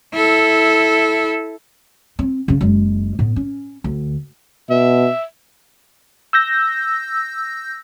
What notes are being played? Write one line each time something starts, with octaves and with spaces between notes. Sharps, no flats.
E4 A4
C4
C#3 C#4
F#1 G#3
A2 B3
C#4
D2
B2 E5
E6 G6 A#6